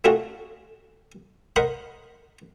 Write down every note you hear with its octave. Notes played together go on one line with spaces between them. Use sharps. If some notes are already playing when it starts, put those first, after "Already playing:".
A3 C4 D4 F4 F#4 G#4
A#4 C5 D#5 F#5 B5